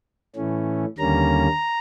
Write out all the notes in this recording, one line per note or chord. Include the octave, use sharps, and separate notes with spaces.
A2 E3 A3 C#4
D#2 D3 G3 A#3 C#4 A#5